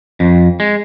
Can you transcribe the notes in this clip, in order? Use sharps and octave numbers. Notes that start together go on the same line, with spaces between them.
F2
G#3